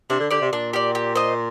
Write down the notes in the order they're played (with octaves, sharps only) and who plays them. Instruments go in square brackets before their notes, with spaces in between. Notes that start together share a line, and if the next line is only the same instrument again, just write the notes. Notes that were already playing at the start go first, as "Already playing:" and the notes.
[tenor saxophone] C3 [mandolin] D4
[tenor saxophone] D3
[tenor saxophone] D3 [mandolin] G4 D5
[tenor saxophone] C3
[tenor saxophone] A#2 [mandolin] D4
[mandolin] G4 D5
G4
C5 D#5